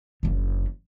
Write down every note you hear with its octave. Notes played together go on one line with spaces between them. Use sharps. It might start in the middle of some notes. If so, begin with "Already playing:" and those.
F#1 D3